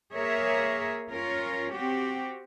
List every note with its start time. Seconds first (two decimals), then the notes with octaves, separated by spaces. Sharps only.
0.15 A#3 G#4 A#4 C#5 E5
1.11 C#4 F4 A#4 C#5
1.73 C4 F#4 G4